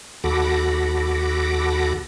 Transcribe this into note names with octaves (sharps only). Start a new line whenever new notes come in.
D#2 F#4 A4 B5 D6 A#6